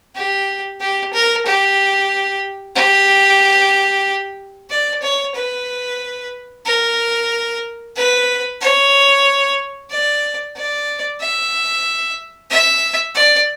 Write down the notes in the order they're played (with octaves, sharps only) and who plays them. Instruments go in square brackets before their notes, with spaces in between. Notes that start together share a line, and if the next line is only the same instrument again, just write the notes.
[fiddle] G4
G4
A#4
G4
G4
D5
C#5
B4
A#4
B4
C#5
D5
D5
E5
E5
D5